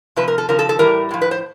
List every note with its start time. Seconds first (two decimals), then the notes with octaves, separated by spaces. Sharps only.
0.16 C3 F3 B4
0.28 A#4
0.38 A4
0.48 C#3 F3 A#4
0.59 A4
0.69 A4
0.79 A2 E3 G3 A#4
1.11 A2 F3
1.21 B4
1.31 C5